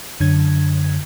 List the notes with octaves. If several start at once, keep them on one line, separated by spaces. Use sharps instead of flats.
F#2 D3 G#6